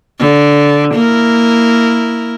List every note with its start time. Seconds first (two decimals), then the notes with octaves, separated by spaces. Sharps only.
0.19 D3
0.94 A#3 E4 A#4